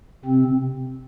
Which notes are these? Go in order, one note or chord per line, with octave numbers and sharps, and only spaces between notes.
C3 C4